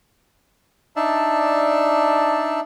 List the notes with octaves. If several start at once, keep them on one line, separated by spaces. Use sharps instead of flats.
D4 D#4 D5 E5 A5